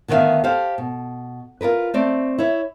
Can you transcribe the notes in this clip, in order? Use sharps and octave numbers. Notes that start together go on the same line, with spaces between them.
D2 D#3 B3 B4 E5 F5
G4 A4 C5 F5
B2
F4 G#4 A#4 B4
A3 C4 D5
E4 C#5 E5